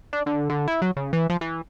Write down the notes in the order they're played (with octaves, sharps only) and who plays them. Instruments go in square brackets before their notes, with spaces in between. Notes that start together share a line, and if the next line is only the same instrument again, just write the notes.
[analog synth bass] D4
D3
D3
E4
F#3
C#3
E3
F3
E3